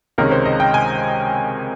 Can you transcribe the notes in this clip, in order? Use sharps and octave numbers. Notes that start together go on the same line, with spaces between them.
C#2 C3 D#3 G#3 C#4 A#4
C5
D#5
G5
G#5